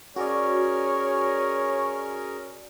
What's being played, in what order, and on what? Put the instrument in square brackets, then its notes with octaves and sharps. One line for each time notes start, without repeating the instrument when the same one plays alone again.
[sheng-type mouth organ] C#4 G#4 A#4 [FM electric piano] F#4 D5 [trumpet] C#5